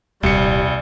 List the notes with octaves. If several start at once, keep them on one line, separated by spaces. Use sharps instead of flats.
D#1 C2 G3 G4 C#7